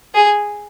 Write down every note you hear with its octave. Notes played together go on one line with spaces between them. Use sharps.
G#4